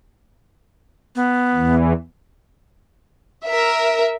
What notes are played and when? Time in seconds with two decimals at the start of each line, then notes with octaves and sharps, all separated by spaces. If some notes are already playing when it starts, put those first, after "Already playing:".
1.16 B3
1.54 E2 E3
3.45 A#4 E5